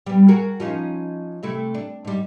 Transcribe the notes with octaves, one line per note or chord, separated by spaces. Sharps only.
G3 B3
F#4 G#4 A#4
F3 C#4 D#4
C3 A3 E4
D4
G#2 G3